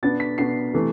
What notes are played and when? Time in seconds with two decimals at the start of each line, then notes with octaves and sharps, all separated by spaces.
0.03 B2 B3 D4 A6
0.20 B6
0.38 B2 B3 D4 C7
0.73 C3 E3 A3